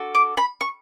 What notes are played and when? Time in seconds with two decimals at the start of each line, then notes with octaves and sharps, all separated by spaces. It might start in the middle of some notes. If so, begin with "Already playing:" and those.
Already playing: D4 F#4 A4
0.15 D6
0.37 B5
0.61 C#6